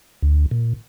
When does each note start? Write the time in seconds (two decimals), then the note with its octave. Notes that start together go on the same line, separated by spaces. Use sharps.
0.22 D2
0.51 A#2